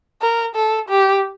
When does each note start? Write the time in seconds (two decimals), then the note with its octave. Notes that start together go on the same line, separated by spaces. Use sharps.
0.22 A#4
0.55 A4
0.89 G4